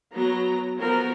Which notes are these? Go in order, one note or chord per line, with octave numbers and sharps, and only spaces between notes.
F#3 B3 A#5
F3 B3 F#4 A#4